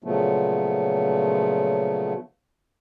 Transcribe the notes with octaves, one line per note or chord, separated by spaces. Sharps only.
A#2 C#3 F3 F#3 A3 B3